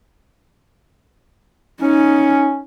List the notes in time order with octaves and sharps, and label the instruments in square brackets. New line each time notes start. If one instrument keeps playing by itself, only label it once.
[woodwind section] C#4 [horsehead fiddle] D#4